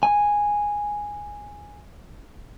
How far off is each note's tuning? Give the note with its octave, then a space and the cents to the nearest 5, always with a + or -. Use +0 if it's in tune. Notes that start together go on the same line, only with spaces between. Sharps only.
G#5 -5